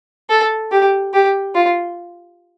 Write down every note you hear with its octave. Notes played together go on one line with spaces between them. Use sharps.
A4
G4
G4
F4